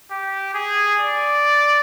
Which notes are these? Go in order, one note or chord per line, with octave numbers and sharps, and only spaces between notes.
G4
G#4
D5